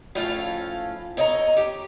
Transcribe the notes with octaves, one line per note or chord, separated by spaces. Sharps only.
A2 F3 A3 C#4 F4 F5
A4 C#5 D#5 G5 A#5
G4